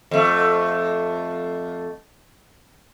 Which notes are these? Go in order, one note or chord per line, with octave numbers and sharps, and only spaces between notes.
F2 A3